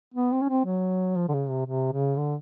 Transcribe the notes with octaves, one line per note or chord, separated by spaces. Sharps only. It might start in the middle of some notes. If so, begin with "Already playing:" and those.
B3
C4
C#4
C4
F#3
F3
D3
C#3
C3
C3
C#3
D3